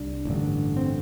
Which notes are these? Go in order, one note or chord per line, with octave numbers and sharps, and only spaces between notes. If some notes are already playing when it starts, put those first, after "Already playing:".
Already playing: C2 D4
A1 G2 D3
C4